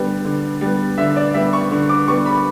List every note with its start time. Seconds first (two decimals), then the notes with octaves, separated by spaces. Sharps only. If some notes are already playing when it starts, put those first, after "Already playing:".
Already playing: D3 G3 B3
0.25 D3
0.61 G3 B3
0.98 D3 E5
1.16 D5
1.34 G3 B3 E5
1.53 C#6
1.71 D3
1.89 D6
2.08 G3 B3 C#6
2.26 B5